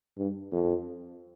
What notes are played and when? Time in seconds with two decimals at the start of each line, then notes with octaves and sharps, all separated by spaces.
0.18 G2
0.52 F2